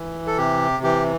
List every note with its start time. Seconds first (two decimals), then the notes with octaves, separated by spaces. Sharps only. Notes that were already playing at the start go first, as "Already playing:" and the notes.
Already playing: E3
0.27 A4
0.37 C3 G4
0.83 E3 G4